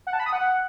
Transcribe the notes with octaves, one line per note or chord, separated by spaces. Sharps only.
F#5
A5
B5
D#6
F#5